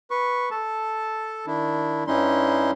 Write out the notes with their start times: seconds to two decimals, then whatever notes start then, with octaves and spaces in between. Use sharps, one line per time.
0.11 B4 C#6
0.51 A4 A5
1.47 D#3 D4 E4
2.07 G2 G3 C#4 D#4 E4 C6